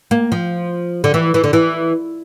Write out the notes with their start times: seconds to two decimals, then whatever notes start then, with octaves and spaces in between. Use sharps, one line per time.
0.11 A#3
0.32 F3
1.04 D3
1.14 E3
1.34 E3
1.44 D3
1.53 E3